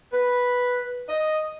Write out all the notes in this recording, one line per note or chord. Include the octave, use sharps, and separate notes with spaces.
B4
D#5